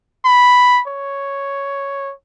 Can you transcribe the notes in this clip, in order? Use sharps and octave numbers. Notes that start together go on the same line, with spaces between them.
B5
C#5